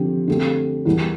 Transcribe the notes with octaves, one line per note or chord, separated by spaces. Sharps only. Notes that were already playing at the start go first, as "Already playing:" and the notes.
Already playing: D3 F3 C4 G4
D3 A3 C4 G4
E2 E3 G3 A#3